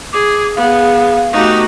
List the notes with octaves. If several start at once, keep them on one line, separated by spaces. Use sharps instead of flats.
G#4 D6
B3 G#4 F5
A3 B3 D#4 F#4 G4